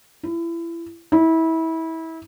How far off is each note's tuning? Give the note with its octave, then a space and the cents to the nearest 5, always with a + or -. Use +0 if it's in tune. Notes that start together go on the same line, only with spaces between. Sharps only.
E4 +30
E4 -25